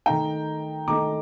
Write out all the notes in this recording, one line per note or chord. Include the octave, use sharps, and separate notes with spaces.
D#3 A3 D#4 G5 A#5
D#3 A3 D#4 A#5 D6